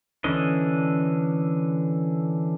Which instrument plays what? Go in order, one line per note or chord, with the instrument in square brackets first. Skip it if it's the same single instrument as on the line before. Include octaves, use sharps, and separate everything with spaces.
[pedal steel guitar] D3 E3 C#4 D4 D#5